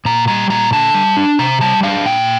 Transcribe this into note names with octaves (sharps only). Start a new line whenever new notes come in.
A#2 A#5
G3 A#5
A#2 A#5
D3 A5
G3
D4
C3 A#5
G3 A5
D4 F5
A#2 G5